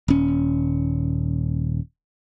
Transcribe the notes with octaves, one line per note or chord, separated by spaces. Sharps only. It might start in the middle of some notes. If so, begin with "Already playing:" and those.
D#1 C#4